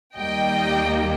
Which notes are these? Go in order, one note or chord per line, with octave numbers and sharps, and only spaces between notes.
D#2 D#3 G3 A#3 D#5 G5